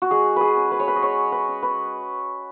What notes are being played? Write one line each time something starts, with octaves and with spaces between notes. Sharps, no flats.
F#4
G#3 G#4
G#4 B4
C#4
B4
C#5
B4
D#5
G#3 C#5
B4
C#4
B4